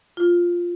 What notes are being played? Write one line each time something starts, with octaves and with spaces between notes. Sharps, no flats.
F4